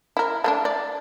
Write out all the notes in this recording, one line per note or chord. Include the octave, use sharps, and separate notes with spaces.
E4 A#4
A3 A#3 D4
D5